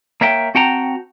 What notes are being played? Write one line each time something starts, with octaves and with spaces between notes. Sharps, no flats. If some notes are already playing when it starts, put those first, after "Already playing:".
A#3 C#5 E5 G5
C4 F#4 F#5 G5 A5 A#5